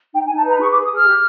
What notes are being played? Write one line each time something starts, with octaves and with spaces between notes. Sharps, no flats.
D#4 G5
G#5
D#4
A5
B4 A#5
G#4 C#6
D6
G#4
D#6
G#4 F6
G4